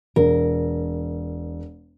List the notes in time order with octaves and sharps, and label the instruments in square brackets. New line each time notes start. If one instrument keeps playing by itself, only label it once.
[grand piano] E1 [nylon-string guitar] A#4